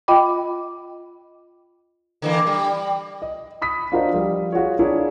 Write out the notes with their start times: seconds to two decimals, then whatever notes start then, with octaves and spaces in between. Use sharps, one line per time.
0.08 F4 D#5 G5 B5 D6
2.22 D3 E3 A#3
2.47 G3
3.22 D#5
3.62 B5 D#6 B6
3.92 D4 F4 F#4 A#4 C5 D#5
4.12 F3 G3
4.52 F4 F#4 G#4 C#5
4.79 D4 E4 F4 G#4 A#4 C#5